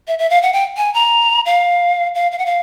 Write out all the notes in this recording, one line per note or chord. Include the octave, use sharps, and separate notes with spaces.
E5
E5
F5
F#5
G5
G#5
A#5
F5
F5
F5
F#5
F5